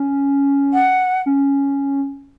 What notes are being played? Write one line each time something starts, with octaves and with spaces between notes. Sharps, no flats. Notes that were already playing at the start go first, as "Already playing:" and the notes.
Already playing: C#4
F#5
C#4